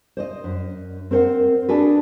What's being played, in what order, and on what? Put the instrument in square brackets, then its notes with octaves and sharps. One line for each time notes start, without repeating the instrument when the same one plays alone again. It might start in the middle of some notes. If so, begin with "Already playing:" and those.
[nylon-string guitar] C5 D5 D#5
F#2
C4 A#4 C5 F#5
D4 F#4 G#4 A4 B4